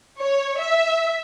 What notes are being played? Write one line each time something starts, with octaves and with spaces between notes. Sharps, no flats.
C#5
E5